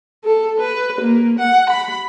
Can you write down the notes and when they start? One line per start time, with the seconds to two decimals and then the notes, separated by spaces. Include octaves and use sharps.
0.25 A4
0.60 B4
1.01 A#3
1.39 F#5
1.70 B5